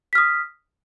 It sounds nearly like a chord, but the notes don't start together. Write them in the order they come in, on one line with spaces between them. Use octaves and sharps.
B6 F6 D#6